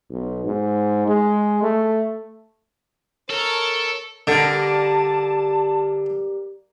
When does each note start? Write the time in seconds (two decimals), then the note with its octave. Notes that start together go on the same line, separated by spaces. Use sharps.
0.10 B1
0.45 G#2
1.08 G#3
1.62 A3
3.30 A4 A#4 C#5
4.27 D3 G3 A#3 A5